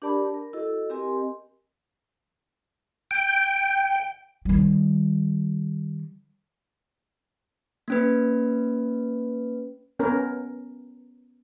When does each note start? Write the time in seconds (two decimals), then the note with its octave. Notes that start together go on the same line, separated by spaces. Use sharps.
0.02 D4 G4 A#4 D5 A5 B5
0.34 A#4
0.53 E4 F#4 A4 D#5
0.90 C4 G4 A#4 D#5 G#5 C6
3.11 G5
4.45 D#3 G3
7.88 A#3 C#4 B4
9.99 B3 C#4 A#4